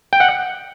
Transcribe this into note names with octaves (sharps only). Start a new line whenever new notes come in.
G5
F#5